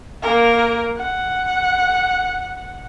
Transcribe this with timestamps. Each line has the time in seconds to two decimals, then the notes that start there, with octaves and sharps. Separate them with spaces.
0.22 A#3 A#4
0.97 F#5